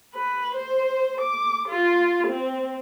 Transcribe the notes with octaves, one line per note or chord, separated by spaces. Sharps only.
B4
C5
D6
F4
C4